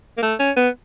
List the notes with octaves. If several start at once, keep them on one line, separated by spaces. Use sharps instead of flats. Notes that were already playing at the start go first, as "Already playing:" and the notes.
A#3
A3
C#4
B3